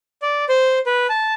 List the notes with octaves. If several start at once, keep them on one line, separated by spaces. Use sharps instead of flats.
D5
C5
B4
A5